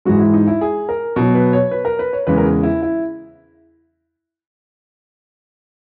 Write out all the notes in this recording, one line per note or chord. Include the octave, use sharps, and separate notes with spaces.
G#2 E3 G#3 F#4
E4
D#4
E4
G#4
A#4
B2 F#3
B4
C#5
B4
A#4
B4
C#5
E2 C#3 G#3 B4
A#4
G#4
E4
E4